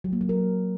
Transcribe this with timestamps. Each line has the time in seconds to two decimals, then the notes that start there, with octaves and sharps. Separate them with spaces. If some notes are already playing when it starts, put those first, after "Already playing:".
0.04 F#3
0.13 A#3
0.21 F#3
0.29 A#4